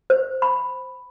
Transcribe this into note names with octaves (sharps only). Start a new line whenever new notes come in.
C5
B5